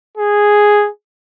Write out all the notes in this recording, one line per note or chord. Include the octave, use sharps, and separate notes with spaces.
G#4